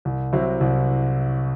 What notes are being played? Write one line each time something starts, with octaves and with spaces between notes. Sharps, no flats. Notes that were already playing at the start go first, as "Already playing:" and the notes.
C2
C3 F#3 C4 E4
C2